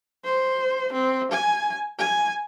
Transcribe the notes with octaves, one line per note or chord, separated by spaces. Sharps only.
C5
C4
G#5
G#5